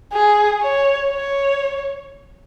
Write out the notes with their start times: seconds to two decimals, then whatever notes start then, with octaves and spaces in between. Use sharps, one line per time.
0.13 G#4
0.62 C#5
1.11 C#5